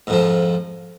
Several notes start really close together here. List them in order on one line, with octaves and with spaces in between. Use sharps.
G#2 F2 F3